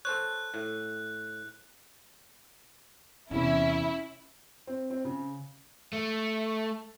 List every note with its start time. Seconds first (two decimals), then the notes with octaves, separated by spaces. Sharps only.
0.05 A4 C5 C#5 F#6
0.54 A2
3.31 E2 C3 C#4 E4
4.67 C4
4.90 C4
5.05 C#3
5.93 A3